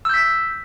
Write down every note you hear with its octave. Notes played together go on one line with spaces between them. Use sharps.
E6 G6 B6